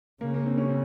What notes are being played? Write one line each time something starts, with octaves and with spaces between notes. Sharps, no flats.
C#3 A#3
A#3
C4
C#4
C4